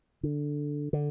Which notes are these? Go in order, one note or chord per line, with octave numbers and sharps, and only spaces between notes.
D3
D3